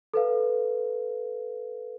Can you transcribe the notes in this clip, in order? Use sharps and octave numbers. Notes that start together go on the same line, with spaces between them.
A4 B4 F5